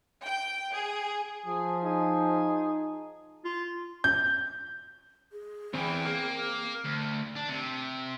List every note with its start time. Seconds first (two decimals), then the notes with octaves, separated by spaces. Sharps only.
0.22 G5
0.72 G#4
1.46 F3 G#4
1.84 D#4 G#4
3.45 F4
4.04 G6
5.32 G#4
5.74 E2 E3 C4 G5
6.05 A#3
6.84 D2
7.36 D4
7.49 C3